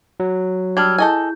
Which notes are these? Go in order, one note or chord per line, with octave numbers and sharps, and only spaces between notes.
F#3
G3 D4 E6 F6 G#6
E4 G#4 A4 D#5 G#5 G6